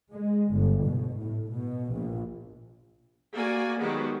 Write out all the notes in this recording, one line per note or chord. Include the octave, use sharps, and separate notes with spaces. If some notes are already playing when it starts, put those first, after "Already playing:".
G#3
G1
B2
A2
B2
A#1
A#3 F#4 D5 G#5
D#3 F#3 G#3 B3 F#4 G4